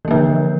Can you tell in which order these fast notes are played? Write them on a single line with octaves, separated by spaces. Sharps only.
E3 A#3 F3 D3